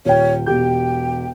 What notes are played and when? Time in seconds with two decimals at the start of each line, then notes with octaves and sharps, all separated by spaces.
0.05 D#1 C#5 G5
0.46 E1 G4 G5 G6